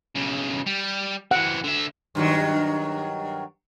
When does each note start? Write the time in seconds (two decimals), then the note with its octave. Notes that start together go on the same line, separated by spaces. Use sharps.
0.15 B1 C#3
0.66 G3
1.31 E3 C4 F#5
1.64 D3 E5
2.15 G2 D#3 F#3